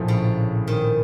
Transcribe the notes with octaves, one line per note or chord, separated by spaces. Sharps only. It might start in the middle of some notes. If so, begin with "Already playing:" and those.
Already playing: A#1 A2 F3 A3
C#3
D#3